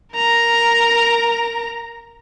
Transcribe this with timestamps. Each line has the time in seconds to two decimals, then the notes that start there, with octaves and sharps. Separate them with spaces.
0.14 A#4 A#5